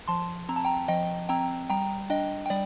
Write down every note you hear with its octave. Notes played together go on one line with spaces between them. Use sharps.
F3 A5 C6
C4 A#5
A5
G5 A#5
F3 D#5 G5
C4 G5 A#5
G3 G5 A#5
D4 D#5 G5
G5
G3 D5